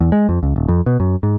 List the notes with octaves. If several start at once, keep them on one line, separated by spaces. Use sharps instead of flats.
E2
G#3
F2
C#2
D#1
F2
B2
F#2
G#2